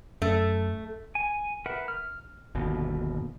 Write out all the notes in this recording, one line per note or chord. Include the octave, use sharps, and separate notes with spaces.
F#2 A3
G#5
A#4 B4 E5 F#5
F6
G1 D#2 B2